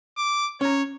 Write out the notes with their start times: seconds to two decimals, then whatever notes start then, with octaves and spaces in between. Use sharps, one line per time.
0.18 D6
0.61 C#4 C#5 A#5